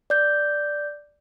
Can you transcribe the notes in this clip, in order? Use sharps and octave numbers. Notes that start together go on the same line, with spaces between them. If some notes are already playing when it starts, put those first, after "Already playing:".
D5 G6